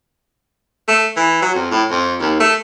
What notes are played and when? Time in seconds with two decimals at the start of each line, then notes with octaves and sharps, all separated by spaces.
0.88 A3
1.17 E3
1.42 F#3
1.55 F2
1.72 A2
1.91 F2
2.21 D#2
2.40 A3